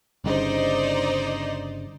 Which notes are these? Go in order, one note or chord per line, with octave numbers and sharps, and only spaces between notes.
G1 G2 C#3 D#4 C5 D5